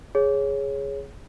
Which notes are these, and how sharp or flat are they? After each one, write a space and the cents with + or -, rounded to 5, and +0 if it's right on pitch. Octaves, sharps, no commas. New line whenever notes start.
G#4 +0 C#5 +0